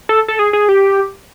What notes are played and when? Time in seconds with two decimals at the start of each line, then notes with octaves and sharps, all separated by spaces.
0.09 A4
0.28 A4
0.39 G#4
0.53 G#4
0.69 G4